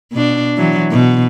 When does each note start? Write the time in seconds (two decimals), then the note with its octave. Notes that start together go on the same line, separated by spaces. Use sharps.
0.12 B2 D4
0.57 E3 F#3
0.91 B2